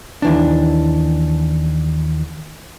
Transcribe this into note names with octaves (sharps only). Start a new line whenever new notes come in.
D#2 E3 D4